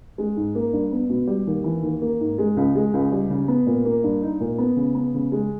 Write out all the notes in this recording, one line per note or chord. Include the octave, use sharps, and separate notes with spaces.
G#3
G#2
A#3
G2
B3
B2
G3
D#2
E3
D#2
A#3
G#2
G#3
C#2
G#3
C#2
G3
C#3
B3
A#2
A#3
G2
D#4
A#2
B3
C#3
B3
C#3
G#3